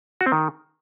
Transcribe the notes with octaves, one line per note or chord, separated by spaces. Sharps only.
F#4
C4
D#3